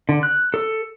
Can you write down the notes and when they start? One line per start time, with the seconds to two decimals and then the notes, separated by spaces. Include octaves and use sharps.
0.09 D3
0.23 F#6
0.54 A4